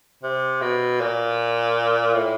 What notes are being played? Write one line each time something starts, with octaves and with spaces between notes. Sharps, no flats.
C3
B2
A#2
A2